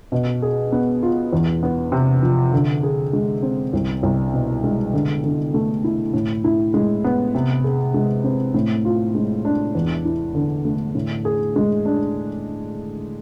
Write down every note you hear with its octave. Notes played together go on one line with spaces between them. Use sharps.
B2
G#4
B3
F4
E2
B3
C3
F3
D3
G#4
G#3
C4
C2
C2
B2
G#3
D3
D3
A3
E4
A2
E4
G#3
B3
C3
G#4
G#3
C4
A2
F4
G#3
D4
E2
E4
D3
A3
A2
G#4
G#3
D4